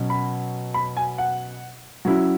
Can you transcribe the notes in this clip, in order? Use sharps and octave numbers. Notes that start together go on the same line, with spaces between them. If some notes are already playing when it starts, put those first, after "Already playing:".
Already playing: B2 F#3 C#4
B5
B5
G#5
F#5
F#3 C#4 E4